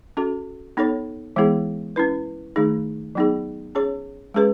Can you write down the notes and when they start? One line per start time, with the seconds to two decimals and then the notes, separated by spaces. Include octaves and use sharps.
0.17 C#4 F#4 A4
0.77 B3 D#4 A4 C#5
1.36 E3 G#3 B3 E4 G#4
1.96 C#4 E4 B4
2.56 D#3 A3 D#4 G#4
3.15 F#3 B3 D#4 G#4
3.75 C#4 G#4 C#5
4.34 G#3 C#4 G#4 B4